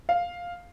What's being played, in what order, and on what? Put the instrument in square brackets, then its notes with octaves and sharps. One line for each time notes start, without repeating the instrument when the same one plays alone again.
[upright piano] F5